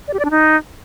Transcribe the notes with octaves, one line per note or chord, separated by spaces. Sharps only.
D5
G4
D5
D4
D#4